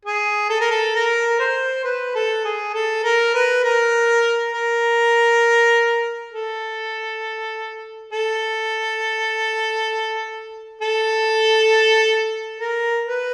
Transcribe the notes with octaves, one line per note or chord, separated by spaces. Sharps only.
G#4
A4
A#4
A4
A#4
C5
B4
A4
G#4
A4
A#4
B4
A#4
A#4
A4
A4
A4
A#4
B4